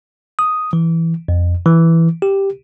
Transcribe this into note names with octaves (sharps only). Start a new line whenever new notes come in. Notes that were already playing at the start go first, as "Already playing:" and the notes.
D#6
E3
F2
E3
G4